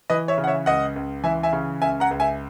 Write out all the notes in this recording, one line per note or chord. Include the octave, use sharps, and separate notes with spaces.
E3 B4 D#5
C#5 E5
C#3
F#5
C#5 E5
C#2 D#5 F#5
C#2
E3 E5 G#5
E5 G#5
C#3
C#2 E5 G#5
F#5 A#5
C#2
E5 G#5